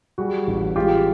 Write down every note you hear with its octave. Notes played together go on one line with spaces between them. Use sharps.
G3 F#4 G#4
A1
G#3 F4 G4